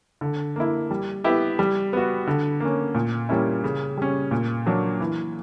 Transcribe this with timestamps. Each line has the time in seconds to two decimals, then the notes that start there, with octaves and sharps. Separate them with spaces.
0.21 D3
0.56 A#3 E4
0.91 G3
1.24 B3 E4 G4
1.59 G3
1.93 B3 F#4
2.27 D3
2.60 A#3 C#4
2.95 A#2
3.29 G3 A#3 C#4 E4
3.64 C#3
3.97 G3 C#4
4.31 A#2
4.66 F#3 A#3 D4
5.00 E3